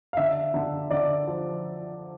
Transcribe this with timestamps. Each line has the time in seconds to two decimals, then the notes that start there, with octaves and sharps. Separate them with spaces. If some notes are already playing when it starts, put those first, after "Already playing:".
0.13 F5
0.17 D3 E5
0.54 D3
0.91 D3 D5
1.27 F3